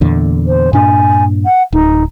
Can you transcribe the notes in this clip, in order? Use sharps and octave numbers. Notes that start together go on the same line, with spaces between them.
E2 A#2 D3
C5
G2 A#2 D4 G#5
F#5
D1 D#4